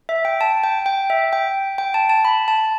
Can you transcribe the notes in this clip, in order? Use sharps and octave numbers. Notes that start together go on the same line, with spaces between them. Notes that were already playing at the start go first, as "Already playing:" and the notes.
E5
G5
A5
G5
G5
E5
G5
G5
A5
A5
B5
A5